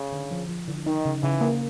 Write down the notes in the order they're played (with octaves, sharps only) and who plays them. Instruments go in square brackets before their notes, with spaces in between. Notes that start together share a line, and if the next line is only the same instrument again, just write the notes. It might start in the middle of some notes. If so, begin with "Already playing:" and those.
Already playing: [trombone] C#3
[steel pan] D3
F3
F3
D3
[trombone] D#3 [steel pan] D#4
[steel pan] C#3
[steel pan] C#3 [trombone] E3
[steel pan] A#3